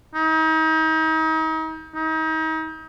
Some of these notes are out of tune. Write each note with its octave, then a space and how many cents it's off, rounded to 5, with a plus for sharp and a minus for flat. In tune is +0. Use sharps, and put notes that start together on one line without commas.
D#4 +35
D#4 +35